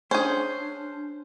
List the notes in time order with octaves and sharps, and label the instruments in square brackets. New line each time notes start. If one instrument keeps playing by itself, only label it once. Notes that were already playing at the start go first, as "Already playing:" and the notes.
[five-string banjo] C#4 G#4 [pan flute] D4 [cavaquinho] C5